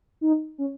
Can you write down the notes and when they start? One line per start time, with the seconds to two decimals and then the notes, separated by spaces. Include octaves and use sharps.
0.21 D#4
0.58 C#4